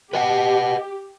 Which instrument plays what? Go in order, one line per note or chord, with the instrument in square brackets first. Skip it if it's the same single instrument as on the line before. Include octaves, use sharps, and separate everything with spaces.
[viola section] G4 [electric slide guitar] B4 D#5 F#5